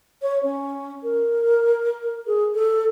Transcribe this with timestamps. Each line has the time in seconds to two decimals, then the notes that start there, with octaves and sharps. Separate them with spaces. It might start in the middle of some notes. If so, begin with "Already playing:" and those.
0.22 C#5
0.43 C#4
1.03 A#4
2.27 G#4
2.55 A4